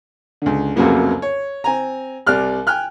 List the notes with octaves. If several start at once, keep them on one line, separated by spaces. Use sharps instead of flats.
C#2 D3
C2 F2 C#3 F#3 A#3 B3
C#5
C4 G#5 A#5
C2 G3 D5 F6 F#6
G5 G#5 F6 F#6